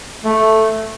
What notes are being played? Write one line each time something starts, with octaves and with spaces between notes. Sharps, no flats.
A3